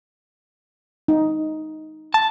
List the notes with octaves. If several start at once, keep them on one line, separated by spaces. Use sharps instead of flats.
D#4
A5